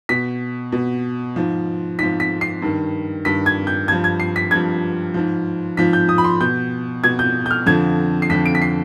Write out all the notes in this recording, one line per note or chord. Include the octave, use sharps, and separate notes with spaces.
B2 B6
B2
G#2 F3
G#2 F3 B6
B6
C7
G2 D#3
G2 D#3 B6
G#6
G6
G2 F3 G#6
G#6
C7
B6
G2 F3 G#6
G#2 F3
G#2 F3 B6
G6
D#6
B5
C6
B2 G6
B2 G#6
G6
G6
F6
F2 D3 F3 G#6
C7
F2 D3 F3 B6
D7
B6
C7